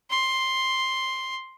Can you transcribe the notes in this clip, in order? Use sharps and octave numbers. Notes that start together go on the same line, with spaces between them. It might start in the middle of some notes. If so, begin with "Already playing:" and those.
C6